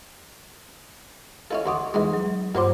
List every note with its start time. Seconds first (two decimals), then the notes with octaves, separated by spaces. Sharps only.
1.51 C#4 E4 A4 D#5 F5
1.66 D2 F#4 C6 D6 D#6
1.94 E2 G#2 G#3
2.14 F#3
2.55 G2 A#2 F#3 C5 C6 D6